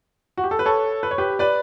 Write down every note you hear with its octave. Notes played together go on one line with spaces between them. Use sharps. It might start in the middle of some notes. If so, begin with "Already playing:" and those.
F#4
G4
A4
B4
A4 C#5
B4
C#5
G4 B4
B4 D5